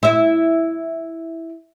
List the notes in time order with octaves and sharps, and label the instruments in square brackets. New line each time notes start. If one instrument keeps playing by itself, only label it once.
[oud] E4 E5